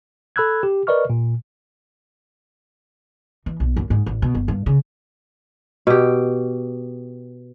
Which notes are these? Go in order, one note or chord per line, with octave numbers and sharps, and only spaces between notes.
A4 B5 E6 F#6 G#6
G4
A#4 B4 D5 D#5 C#6 F6
A#2
E3
B1
F#2
G#2
A1
B2
G1
G2
C#3
B2 G4